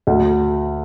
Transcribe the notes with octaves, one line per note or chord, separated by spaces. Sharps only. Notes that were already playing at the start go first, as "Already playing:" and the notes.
D2